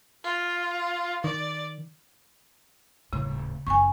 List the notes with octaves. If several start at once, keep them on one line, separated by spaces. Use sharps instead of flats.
F4
D#3 D5
D#1 A2 C#3
F#1 D4 G#5 C#6